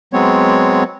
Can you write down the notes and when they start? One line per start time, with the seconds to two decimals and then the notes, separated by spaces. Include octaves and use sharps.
0.13 F#3 G#3 B3 C4 C#5